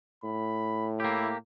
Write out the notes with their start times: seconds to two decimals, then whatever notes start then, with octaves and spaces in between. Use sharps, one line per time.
0.24 A2 B5
1.00 A#3 E4 G4